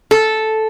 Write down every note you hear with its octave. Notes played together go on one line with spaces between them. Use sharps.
A4